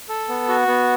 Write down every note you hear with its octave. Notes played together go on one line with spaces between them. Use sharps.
A4
B3
F#4
B3